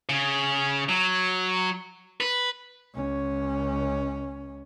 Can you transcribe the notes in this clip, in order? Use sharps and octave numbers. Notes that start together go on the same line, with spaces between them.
C#3
F#3
B4
C#2 C#4